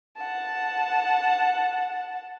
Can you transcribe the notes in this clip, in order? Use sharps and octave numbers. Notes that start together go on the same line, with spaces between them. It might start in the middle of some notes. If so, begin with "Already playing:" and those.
F#5 A5